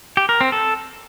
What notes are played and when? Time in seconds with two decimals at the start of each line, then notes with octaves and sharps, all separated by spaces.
0.17 G4
0.29 A#4
0.41 C4
0.52 A4